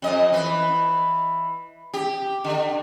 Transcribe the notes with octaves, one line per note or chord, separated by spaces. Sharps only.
F2 D#5
E3 B4
G4
D3